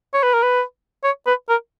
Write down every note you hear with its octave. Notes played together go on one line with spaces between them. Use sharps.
C#5
B4
A#4
B4
C#5
B4
A#4